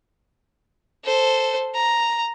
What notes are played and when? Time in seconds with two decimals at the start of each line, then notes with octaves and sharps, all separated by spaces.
1.05 A4 C5
1.74 A#5